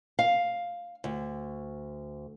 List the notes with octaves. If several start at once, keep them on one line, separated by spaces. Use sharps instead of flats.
F5
D2